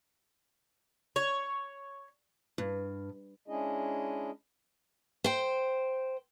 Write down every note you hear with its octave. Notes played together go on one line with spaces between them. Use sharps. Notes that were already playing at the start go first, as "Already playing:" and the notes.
C#5
G2
G#3 C#4 D4 E4 G#4 D#5
C5 G5